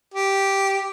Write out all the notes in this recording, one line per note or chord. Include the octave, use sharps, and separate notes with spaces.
G4